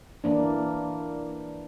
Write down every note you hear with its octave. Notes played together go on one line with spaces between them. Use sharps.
E3 A#3 D4